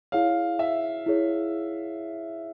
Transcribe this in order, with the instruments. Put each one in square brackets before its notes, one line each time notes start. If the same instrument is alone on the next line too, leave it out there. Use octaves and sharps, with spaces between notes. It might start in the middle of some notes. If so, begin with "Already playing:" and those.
[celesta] E4 G#4 C#5 [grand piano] F5
[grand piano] E5
[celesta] E4 G#4 C#5